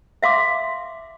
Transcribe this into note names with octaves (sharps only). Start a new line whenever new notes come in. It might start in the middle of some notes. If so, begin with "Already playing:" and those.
E5 F5 C6 D6